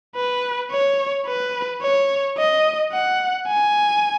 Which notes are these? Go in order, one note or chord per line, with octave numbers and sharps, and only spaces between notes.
B4
C#5
B4
C#5
D#5
F#5
G#5